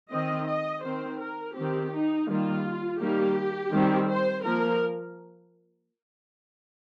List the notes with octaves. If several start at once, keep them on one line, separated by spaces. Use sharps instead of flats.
D#3 C4 D#5
D#5
D#3 C4 C5
A#4
D#3 C4 G4
D#4
D#3 G3 A#3 F4
D#3 G3 A#3 G4
D#3 G3 C4
C5
F3 A#3 A#4